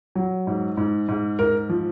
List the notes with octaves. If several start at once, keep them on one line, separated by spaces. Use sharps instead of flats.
F#3
G#2
G#2
G#2
G#2 A#4
F3